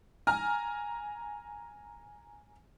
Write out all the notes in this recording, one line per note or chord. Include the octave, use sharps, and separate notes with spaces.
G#5 A#5 F6